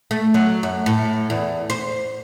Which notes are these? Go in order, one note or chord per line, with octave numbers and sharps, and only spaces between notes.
A3
F#3
F#2
A2
E2
C5